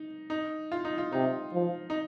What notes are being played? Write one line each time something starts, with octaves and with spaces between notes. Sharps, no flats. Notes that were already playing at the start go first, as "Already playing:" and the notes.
Already playing: D#4
D#4
F4
D#4
F4
C3 D#4
F3
D#4